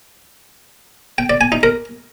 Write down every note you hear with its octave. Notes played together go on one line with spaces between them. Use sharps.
G5
D5
G#5
D#4
A#4